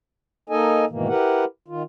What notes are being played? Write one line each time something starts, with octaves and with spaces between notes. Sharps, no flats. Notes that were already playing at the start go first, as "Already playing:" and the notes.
A#3 D#4 A4 D#5 G#5
G#2 B2 D#3 E3 A#3
E4 G4 A#4 B4 F#5
D#3 F4